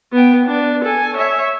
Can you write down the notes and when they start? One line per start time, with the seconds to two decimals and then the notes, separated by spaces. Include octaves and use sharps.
0.12 B3 G5
0.45 B3 D4
0.84 A4 G#5
1.15 C#5 E5